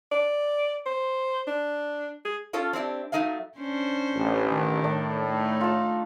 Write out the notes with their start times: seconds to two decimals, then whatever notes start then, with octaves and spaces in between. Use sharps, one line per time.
0.11 D5
0.86 C5
1.47 D4
2.25 G#4
2.53 C#4 F4 A4 C#5
2.73 C4 D4 E4 G4
3.12 F#3 A3 D#4 E5 F5
3.58 C#4 D4 C5
4.16 A1
4.49 D#3
4.84 A2 D4
5.27 A3 D#4
5.61 F4 A5